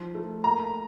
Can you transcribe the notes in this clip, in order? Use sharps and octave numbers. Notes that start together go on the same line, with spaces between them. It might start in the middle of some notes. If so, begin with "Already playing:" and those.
Already playing: F3 D#4
A3
A#3 A#5